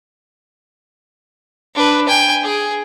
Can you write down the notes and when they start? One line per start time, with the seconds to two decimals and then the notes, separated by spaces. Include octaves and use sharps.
1.75 D4 B4
2.08 G5 G#5
2.43 G#4